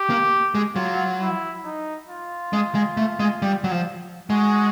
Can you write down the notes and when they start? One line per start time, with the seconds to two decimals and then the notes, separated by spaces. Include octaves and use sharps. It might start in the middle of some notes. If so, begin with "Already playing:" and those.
Already playing: G4
0.10 A#3
0.55 G#3
0.76 F#3 F4
1.21 E4
1.65 D#4
2.09 F4
2.53 G#3
2.75 G#3
2.97 A3
3.20 G#3
3.42 G3
3.64 F#3
3.71 F3
4.30 G#3 F#4